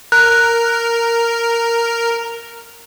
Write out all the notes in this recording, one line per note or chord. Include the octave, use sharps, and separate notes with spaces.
A#4 F#6